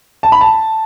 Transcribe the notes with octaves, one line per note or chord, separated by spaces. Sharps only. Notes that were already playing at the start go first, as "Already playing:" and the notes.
A5
B5
A5